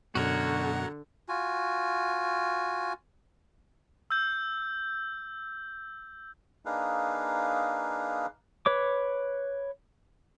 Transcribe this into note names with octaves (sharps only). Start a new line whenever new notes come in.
F#2 B2 D3 F#4 A#4 C#5 F#5
F4 F#4 G#5
E6 G6
A#3 D4 D#4 G#4 B4 F5
B4 C#5 D6